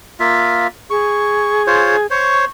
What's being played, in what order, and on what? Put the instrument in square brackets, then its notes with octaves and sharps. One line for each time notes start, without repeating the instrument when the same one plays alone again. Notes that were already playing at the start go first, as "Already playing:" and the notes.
[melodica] A#3 F4 E5
[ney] G#4 [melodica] C#6
[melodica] F4 C5 C#5
[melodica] C5 C#5 [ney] C#6